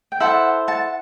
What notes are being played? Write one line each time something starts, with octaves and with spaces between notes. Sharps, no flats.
G5
E4 A4 C5 F#5 A5
F#5 A5